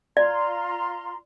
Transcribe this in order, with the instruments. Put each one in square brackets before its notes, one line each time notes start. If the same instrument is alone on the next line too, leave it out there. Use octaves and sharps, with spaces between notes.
[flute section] F4 A#5 C6 [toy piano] D5